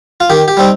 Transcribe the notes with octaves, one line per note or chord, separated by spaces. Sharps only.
F4
D#3 G4
G4
G3 C4 D#4